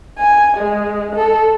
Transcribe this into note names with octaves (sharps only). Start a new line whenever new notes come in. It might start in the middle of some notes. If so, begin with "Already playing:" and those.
G#5
G#3
A4